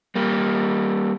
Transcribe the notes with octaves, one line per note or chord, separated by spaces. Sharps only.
G3 A#3